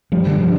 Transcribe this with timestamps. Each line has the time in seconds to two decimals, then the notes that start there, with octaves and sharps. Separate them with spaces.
0.12 G2 F3 G3 D4
0.26 D3
0.41 F3 G3 D4